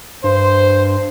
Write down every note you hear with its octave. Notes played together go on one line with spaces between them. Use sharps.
G2 C5